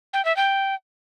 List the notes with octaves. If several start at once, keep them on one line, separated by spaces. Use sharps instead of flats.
G5
E5
G5